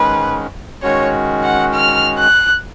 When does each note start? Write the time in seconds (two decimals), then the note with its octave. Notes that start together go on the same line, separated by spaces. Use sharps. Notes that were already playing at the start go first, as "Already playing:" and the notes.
Already playing: G#2 D#3 G#3 C#4 B4
0.83 D#3 G#3 C#4 F#4 C#5
1.43 F#5
1.74 F6
2.19 F#6